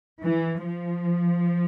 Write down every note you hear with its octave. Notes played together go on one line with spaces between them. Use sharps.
E3
F3